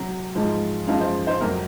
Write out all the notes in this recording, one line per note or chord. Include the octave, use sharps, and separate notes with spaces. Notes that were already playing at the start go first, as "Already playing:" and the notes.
Already playing: C3 F#3
G#2 F3 G#3
F#2 F3 G#3 F5
C5
C5
F2 C3 F#3 A#4